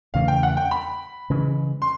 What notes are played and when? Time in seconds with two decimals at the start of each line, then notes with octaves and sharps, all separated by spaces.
0.14 E2 C#3 E3 A3 F5
0.28 G5
0.43 F#5
0.57 G5
0.71 B5
1.30 C#3 E3 G#3
1.82 C6